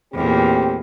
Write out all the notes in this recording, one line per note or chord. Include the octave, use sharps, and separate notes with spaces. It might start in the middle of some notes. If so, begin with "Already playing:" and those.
E2 A#2 A3 C4 G4